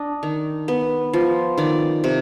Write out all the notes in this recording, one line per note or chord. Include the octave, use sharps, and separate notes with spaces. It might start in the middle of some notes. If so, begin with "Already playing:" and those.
Already playing: D4 D#5
D#3
B3
F3
D#3 D5
C3